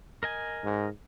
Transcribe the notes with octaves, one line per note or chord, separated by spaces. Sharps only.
A#4 D#5 G#5
G#2